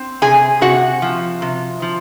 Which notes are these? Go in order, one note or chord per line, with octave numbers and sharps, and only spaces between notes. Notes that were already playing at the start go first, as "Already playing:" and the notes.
Already playing: C4
C3 G#4 G#5
C3 F#4 F#5
F3
C3
F3